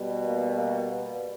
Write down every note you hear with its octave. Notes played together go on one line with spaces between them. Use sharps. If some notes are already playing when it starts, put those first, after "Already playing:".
Already playing: B2 G3
A#3
A#3
B3